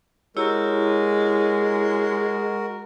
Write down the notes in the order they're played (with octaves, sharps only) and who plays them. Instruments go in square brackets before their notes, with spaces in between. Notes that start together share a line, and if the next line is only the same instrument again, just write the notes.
[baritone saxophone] G#3 [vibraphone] E4 G4 C#5 [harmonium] F#4 A#4